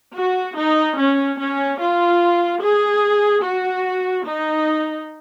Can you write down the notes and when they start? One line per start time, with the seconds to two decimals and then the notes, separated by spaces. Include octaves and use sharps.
0.15 F#4
0.56 D#4
0.97 C#4
1.39 C#4
1.80 F4
2.62 G#4
3.44 F#4
4.25 D#4